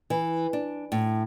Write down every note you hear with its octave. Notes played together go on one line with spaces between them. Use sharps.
E3
D4
A2